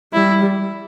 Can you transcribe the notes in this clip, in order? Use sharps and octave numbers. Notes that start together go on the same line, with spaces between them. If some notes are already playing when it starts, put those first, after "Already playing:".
G3 E4